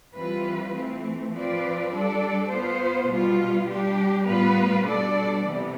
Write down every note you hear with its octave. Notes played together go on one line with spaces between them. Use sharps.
E3 G3 C4 F4 B4
E3 A3 C4
F3 C4 F4 B4 D5
G3 D4 A4 D5
B3 F4 C5
B2 G3 B3 F4
G3 D4 G4
A2 G3 B3 F4 B4
B2 G3 D4 A4 D5
C3 E3 B3